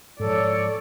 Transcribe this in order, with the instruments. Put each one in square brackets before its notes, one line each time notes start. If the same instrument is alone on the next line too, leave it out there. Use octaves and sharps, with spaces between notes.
[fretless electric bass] G#2 F3 [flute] A4 [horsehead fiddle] C#5 D5